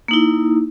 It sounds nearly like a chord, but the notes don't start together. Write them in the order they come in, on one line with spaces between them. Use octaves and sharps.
A#3 D#4 E4